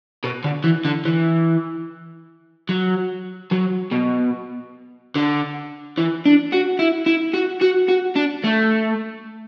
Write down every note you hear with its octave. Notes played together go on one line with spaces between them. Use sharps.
B2
D3
E3
D3
E3
F#3
F#3
B2
D3
E3
D4
F#4
E4
E4
F#4
F#4
F#4
D4
A3